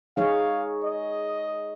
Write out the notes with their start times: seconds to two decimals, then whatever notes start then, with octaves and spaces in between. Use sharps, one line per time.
0.17 G#3 D#4 G#4 C#5 F5
0.84 D#5